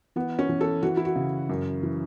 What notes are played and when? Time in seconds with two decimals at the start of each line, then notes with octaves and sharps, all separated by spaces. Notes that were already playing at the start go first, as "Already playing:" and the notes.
0.16 E3 B3
0.39 C#4
0.49 E3
0.61 A4
0.83 E3 F#4
0.97 E4
1.05 F#4
1.16 C#3
1.49 F#2
1.83 E3